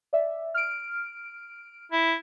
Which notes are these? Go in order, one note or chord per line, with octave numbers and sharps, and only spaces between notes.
D5 E5
F6 D7
E4